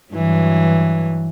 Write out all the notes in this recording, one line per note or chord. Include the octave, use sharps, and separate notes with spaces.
G2 E3 F#3